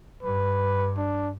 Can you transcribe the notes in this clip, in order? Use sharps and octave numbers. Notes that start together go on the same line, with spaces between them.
G2 B4
D4